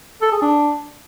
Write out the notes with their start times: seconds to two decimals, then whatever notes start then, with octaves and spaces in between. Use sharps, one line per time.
0.22 A4
0.32 G#4
0.42 D4